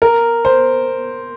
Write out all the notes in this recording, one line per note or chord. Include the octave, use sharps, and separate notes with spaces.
A#4
C5